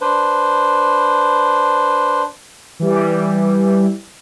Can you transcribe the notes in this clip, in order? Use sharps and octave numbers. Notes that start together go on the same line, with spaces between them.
D4 B4 C5
E3 G3